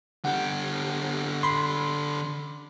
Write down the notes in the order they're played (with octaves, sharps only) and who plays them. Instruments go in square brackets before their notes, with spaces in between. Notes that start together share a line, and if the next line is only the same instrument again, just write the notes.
[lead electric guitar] D3 G4 [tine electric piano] F#5
[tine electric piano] B5 C6